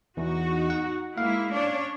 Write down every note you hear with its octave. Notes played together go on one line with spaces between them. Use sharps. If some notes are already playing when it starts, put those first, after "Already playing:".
E2 D#4 F#4
F#5
G#3 A#3 E4 F5
C#4 D4 C#5